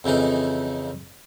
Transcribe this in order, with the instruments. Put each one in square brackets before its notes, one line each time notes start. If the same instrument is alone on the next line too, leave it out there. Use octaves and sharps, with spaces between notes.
[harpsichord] F2 C#3 E3 D#4